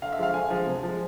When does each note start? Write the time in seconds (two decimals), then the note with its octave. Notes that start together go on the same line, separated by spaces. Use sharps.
0.02 D3 F5
0.12 E5
0.18 F3 G#3 F5
0.34 D3 G#5
0.50 F3 G#3
0.67 C3
0.83 F3
0.88 G#3